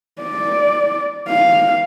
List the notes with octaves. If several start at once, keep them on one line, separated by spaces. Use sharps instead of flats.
D5
F5